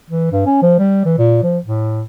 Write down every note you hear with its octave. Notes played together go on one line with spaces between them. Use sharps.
E3
G2
C#4
F3
G3
E3
A#2
F3
A2